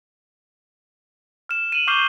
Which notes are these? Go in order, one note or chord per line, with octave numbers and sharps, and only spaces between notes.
F6 E7
D#7 F#7
C#6 D6 F6 G6 C7 G7